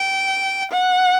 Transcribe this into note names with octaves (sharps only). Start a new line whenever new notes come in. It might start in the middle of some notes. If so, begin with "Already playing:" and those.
Already playing: G5
F#5